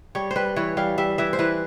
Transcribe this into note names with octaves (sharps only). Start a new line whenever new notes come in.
G3 C#5
C5
G3 B4
E3 C#5
G3 F5
G3 E5
E3 E5
C5
E3 B4